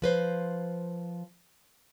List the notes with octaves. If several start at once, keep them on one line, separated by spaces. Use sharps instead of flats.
F3 B4 C5